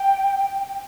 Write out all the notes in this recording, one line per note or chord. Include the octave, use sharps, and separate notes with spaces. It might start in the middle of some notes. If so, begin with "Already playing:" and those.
Already playing: G5